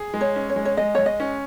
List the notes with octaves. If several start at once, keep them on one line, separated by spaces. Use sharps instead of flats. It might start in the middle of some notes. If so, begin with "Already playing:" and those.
Already playing: G#4
G#3
C#5
C#4
C#5
G#3
C#5
G#3 D#5
G#3 C#5
D#5
C#4